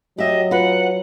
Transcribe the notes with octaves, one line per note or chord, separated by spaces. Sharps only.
F#3 G4 D#5 E5
F4 B4 F#5